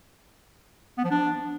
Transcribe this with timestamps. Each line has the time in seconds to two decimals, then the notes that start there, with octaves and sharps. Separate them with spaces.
0.98 B3
1.04 F3
1.11 D4